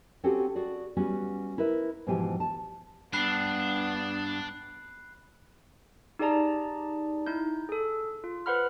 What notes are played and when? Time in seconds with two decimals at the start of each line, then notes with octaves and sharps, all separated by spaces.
0.24 C4 C#4 F#4 G4 A4
0.55 F#4 G#4 D5
0.97 G3 B3 C#4 F#4
1.58 E4 A#4 B4 E5
2.07 G#2 B2 E3 F3 G4 G#5
2.40 A5
3.13 G2 B3 D4 B5 F#6 C7
6.19 D#4 G4 G#4 D5 A5 A#5
7.26 D#4 E4 G6
7.69 G#4 A4
8.24 F4
8.46 B4 C5 F#5 B5 F6